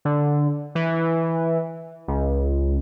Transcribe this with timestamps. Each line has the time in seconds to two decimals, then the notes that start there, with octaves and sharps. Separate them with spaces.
0.05 D3
0.75 E3
2.08 C#2